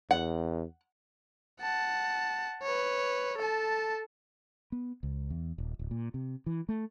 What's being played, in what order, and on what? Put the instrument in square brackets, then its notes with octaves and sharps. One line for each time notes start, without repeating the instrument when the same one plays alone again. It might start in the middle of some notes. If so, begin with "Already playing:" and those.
[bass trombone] E2 [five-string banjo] F#5
[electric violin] F#5 A5
B4 C#5
A4 A5
[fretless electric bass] B3
C#2
E2
D#1
D1
A#2
C3
E3
A3